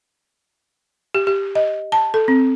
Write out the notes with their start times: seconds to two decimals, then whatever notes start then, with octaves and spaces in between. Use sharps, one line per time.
1.15 G4
1.27 G4
1.55 D#5
1.92 A5
2.14 A4
2.28 C4